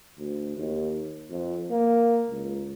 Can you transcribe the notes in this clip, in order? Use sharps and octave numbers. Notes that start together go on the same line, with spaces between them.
D2
D#2
F2
A#3
C#2